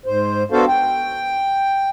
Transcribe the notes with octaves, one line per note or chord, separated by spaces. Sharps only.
G#2 C5
B3 D4 F#4 A4 C5 F5
G5